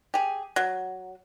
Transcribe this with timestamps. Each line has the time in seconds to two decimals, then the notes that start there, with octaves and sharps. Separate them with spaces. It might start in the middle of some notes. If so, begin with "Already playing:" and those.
0.14 G4 G#4
0.56 F#3